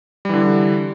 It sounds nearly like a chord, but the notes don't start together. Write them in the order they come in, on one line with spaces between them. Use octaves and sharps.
G3 E3 D3